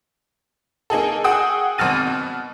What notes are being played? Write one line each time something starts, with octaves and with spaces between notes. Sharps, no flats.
A#3 D#4 G#4 A4
F#4 G#4 F#5 G5 D#6 E6
G#1 B2 C4 F6 A6 D#7
B2